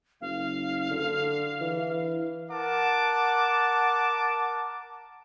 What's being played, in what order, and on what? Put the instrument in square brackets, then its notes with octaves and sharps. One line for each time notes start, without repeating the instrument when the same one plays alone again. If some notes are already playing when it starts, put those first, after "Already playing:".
[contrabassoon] F#1 [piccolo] F5
[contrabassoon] D3
E3
[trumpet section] A#4 F#5 A5 D6